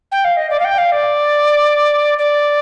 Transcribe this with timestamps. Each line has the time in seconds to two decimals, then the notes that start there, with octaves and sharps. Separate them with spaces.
0.12 G5
0.25 F5
0.37 D#5
0.50 D5
0.60 F5
0.65 G5
0.78 F5
0.92 D5
2.19 D5